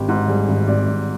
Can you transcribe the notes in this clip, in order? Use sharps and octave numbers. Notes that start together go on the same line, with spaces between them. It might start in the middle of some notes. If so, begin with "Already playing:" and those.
Already playing: G#1 G4
G#2
G3 G#4
G#1
G#1 D5
G#1